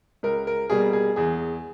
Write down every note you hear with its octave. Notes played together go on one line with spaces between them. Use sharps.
C#2 A#4
A#4
B2 G3 A#3 G#4
G#4
E2 G#4